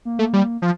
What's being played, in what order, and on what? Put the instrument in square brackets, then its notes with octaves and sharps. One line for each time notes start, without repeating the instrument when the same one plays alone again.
[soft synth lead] A#3
[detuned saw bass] A3
G3
F3